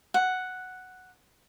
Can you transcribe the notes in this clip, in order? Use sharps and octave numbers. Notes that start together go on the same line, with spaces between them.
F#5